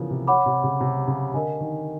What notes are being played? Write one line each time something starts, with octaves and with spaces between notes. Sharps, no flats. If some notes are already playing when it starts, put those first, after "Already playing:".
Already playing: C#3 E3 F3 B3 F4 A#4
C3
C#5 F#5 B5 D6
C3
C#3
C3
C#3
D3 A#4 D#5 G#5
D#3